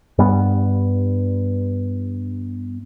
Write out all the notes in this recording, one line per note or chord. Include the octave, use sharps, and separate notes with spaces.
G2 G3 B3